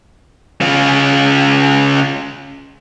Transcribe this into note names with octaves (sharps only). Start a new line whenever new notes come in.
C#3 F4